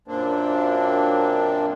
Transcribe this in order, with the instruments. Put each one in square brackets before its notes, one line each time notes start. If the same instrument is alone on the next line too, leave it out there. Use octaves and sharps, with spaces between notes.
[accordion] F#2 A#2 A#3 C4 D4